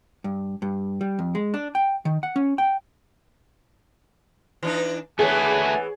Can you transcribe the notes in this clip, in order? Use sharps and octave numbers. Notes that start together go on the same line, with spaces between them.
G2
G2
G3
F2
G#3
D4
G5
D#3
F#5
C#4
G5
E3 D4 D#4
E3 A3 B3 F#4 G#4 C#5 G#5